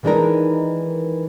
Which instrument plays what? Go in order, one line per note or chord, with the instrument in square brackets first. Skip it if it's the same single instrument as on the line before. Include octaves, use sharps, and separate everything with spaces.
[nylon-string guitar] D#3 E3 G#3 D4 D#4 A#4